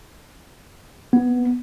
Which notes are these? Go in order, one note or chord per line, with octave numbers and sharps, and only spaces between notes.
B3